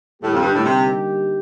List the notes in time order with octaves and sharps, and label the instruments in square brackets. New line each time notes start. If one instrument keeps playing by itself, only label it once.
[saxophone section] A2 [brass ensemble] D3 G3 A#3 D#4 G4
[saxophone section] F2
G2
A2
C3